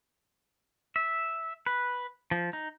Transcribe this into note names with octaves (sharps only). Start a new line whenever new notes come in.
E5
B4
F3
D#4